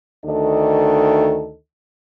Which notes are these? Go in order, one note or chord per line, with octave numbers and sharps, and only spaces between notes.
D2 D#3 D4 A4 D#5